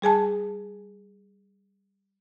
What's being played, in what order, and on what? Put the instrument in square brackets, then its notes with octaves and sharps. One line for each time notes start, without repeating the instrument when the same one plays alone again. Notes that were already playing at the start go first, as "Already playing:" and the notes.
[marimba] G3 G#4 G#5 A5